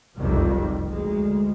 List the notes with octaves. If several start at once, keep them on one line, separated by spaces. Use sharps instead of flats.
F#1 C2 F2 C3 D#3 G3
D2 G#3